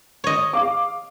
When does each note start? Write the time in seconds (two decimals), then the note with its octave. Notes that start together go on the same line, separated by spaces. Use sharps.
0.24 C#5 D#5
0.53 F5 D6